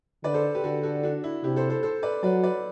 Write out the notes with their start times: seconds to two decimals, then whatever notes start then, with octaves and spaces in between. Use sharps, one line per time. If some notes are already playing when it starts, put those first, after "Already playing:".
0.24 D3 B4 D5
0.34 A4 C5
0.55 G4 B4
0.64 D3 F#4 A4
0.83 F#4 A4
1.03 D4 F#4
1.24 E4
1.44 C3 E4 G4
1.56 A4 C5
1.70 A4 C5
1.83 A4 C5
2.03 B4 D5
2.23 F#3 B4 D5
2.44 B4 D5